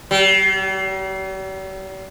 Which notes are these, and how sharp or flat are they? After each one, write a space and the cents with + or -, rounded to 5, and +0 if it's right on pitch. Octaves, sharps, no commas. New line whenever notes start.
G3 -45